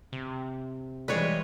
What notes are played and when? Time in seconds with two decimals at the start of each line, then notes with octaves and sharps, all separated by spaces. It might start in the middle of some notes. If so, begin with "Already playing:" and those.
0.12 C3
1.08 E3 G3 G#3 B4 C#5